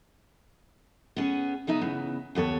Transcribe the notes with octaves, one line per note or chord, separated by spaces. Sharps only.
B3 C#4 G#4
C#3 B3 D#4 E5
C#3 E3 B3
D#2 B3 A4 C#5